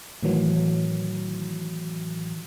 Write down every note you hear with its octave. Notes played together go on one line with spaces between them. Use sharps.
A2 D#3 E3 F#3